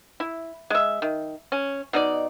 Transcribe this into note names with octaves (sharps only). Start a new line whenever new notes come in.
E4
G#3 E5
D#3
C#4
B2 D#4 D5